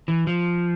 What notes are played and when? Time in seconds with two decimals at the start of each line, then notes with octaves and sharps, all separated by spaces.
0.08 E3
0.27 F3